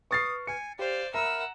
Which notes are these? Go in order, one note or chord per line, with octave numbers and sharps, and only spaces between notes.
B4 C#6 D#6 F6 A6 C7
G#5 C#7
G4 C5 D5 F5
A#4 E5 F#5 A#5 B5 E6 F6